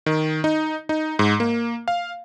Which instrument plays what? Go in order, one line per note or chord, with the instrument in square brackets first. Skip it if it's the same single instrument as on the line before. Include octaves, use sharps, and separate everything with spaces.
[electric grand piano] D#3
D#4
D#4
G#2
A#3
F5